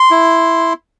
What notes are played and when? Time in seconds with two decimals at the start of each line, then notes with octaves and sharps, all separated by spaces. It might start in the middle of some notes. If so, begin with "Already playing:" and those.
Already playing: C6
0.11 E4